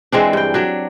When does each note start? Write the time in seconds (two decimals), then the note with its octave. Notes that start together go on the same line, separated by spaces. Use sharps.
0.12 E3 G#3 C4 D4
0.33 G2 G5
0.54 F#3 D4